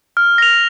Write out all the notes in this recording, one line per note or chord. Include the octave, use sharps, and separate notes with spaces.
F6
A#6 F7